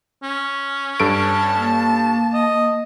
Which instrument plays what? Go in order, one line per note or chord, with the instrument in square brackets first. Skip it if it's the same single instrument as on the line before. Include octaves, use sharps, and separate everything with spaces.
[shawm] C#4
[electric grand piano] G2 A4 D7 [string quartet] A5
[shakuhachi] A#3
[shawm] D#5